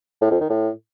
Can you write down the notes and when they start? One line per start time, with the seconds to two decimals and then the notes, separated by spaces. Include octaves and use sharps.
0.21 A2
0.31 F2
0.40 D#3
0.50 A2